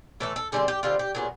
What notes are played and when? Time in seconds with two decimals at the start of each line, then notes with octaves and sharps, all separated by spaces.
0.20 A2 E3 A3 A4
0.36 A4
0.52 D3 G3 C4 G#4
0.68 G4
0.83 D3 G3 C4 F4
0.99 G4
1.15 A#2 F#3 B3 G#4